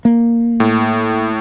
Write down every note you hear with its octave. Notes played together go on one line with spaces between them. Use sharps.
A#3
A2